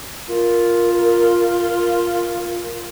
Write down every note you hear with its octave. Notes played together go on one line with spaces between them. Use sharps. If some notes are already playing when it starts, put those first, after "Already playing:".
F4 A#4